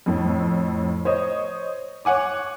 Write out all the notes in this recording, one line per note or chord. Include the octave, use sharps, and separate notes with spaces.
F2 A2
C5 C#5 D#5
C#5 F#5 G#5 D6